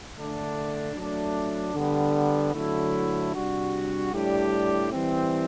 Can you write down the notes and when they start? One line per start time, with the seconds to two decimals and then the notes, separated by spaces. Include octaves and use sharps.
0.17 D3 A3 D4
0.96 F#3 A3 D4
1.74 D3 G3 B3
2.54 D3 F#3 A3 E4
3.34 C3 G3 D4 F#4
4.12 A2 G3 D4 G4
4.92 E3 G3 C4